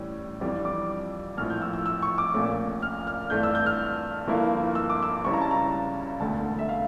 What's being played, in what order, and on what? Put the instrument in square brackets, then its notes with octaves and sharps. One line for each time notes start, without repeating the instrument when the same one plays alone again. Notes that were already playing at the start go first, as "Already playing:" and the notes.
Already playing: [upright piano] A2 E3 G3 C#4
F2 E3 G3 D4
D6
A#1 A2 F3 F6
G6
E6
E6
E6
C#6
D6
A#1 A#2 A3 C#4
F6
F6
G2 E3 A3 D4 G6
E6
G6
F6
G1 G2 F3 A#3 E4
E6
D6
E6
C#2 C#3 G3 C#4 E4 C#6
A#5
A5
A#5
E1 D2 D3 A3 A5
E5
F5